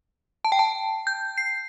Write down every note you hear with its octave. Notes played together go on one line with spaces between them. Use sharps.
A5
G5
A5
G6
C7